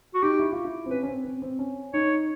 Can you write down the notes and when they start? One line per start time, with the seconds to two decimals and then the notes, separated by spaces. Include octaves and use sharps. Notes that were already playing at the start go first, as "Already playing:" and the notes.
0.14 F#4
0.22 D#4 G4
0.39 E4
0.52 F4
0.65 E4
0.86 C4
0.90 C#4 B4
1.03 C#4
1.07 C4
1.25 C4
1.42 C4
1.59 C#4
1.93 D#4 C#5